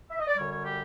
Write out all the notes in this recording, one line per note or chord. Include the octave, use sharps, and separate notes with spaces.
E5
D#5
D5
F#2 D3 G3 C#5
C#5
G4